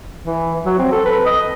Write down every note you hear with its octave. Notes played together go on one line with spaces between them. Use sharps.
E3
F#3
C4
A4
B4
D#5